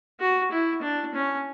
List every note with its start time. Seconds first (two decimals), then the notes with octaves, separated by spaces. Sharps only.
0.20 F#4
0.51 E4
0.82 D4
1.15 C#4